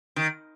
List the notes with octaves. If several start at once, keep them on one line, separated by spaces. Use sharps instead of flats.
D#3